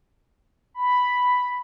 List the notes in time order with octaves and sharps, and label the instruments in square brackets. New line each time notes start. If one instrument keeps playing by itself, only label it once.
[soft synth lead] B5